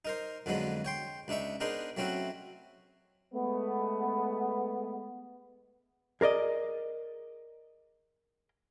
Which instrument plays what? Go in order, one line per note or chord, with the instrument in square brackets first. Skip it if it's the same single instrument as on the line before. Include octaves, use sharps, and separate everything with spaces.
[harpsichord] D#4 A#4 C5
F2 D3 F3 F#3 G#3 B3
C#5 G5 C6
C#2 D4 D#4 E5 C#6
B3 D4 D#4 G#4 A#4 C5
F#3 A3 C4 C#4 E4 F#4
[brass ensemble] G#3 A3 B3
[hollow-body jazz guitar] G#4 A#4 D5 D#5